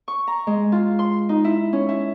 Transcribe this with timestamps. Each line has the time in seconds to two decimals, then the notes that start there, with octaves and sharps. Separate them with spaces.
0.08 C#6
0.27 A#5
0.47 G#3
0.72 F4
0.99 C6
1.29 D#4
1.44 E4
1.73 C#4
1.89 E4